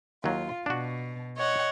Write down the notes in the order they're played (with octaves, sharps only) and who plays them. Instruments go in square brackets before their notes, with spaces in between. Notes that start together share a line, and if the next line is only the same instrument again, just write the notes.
[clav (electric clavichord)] D#2 F#3 [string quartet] F4
[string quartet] B2 [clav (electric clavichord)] D4 F#4
[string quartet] C#5 D#5 F#5